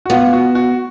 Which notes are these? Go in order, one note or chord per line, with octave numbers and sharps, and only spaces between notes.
F#4
B3 F4
F#4
F#4